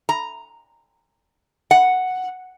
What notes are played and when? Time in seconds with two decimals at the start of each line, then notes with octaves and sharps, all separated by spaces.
0.09 A#5
1.71 F#5